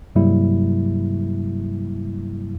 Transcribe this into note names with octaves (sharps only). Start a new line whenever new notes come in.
G2 C3 F#3 G3 A#3 E4